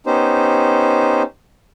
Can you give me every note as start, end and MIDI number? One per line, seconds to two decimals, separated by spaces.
0.06 1.22 59
0.06 1.22 61
0.06 1.22 63
0.06 1.22 67
0.06 1.22 72